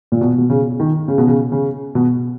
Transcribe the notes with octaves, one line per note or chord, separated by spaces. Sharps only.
A#2
B2
B2
C#3
D#3
C#3
B2
C#3
C#3
B2